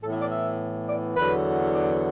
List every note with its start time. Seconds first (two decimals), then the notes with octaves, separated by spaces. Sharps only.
0.01 A2 E3 B3 A4
0.11 E5
0.21 D5
0.30 E5
0.87 D5
1.16 E2 D3 F#3 B3 B4
1.74 D5